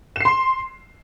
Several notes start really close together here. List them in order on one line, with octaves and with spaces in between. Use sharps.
E7 C7 C6